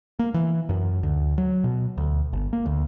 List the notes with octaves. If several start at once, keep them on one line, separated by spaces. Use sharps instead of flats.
A#3
E3
F#2
D2
F#3
B2
D2
G1
A#3
D2